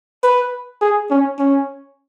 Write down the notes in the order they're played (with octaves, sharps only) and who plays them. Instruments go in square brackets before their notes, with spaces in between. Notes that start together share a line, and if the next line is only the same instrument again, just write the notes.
[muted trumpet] B4
G#4
C#4
C#4